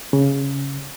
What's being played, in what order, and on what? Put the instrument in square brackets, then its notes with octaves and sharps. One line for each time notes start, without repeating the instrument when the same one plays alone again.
[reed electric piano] C#3